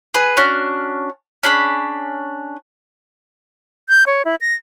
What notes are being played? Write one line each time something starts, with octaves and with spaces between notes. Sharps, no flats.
G#4 B4
C#4 D4 F#4 F6
C#4 D4 G#4 B5
G6
C#5
E4
A#6